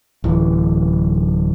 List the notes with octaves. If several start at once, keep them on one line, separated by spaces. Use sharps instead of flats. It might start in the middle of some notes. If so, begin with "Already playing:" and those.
D1 E3